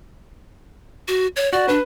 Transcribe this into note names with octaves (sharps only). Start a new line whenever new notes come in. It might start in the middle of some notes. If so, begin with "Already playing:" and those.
F#4
C#5
F#4 D5
D4 B4